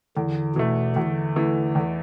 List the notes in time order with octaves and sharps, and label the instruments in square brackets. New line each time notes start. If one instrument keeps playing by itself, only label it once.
[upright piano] E2 [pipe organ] D3
[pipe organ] B2 [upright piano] E3 A3
[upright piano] E2 [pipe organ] D3
[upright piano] E3 A3
E2